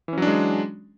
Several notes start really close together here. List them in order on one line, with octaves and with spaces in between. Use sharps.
E3 C#4 F#3 D4 G#3